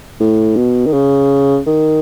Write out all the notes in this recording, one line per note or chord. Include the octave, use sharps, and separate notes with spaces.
A2
B2
D#3
C#3
D#3